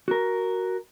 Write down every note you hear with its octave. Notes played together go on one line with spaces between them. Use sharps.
F#4 A#4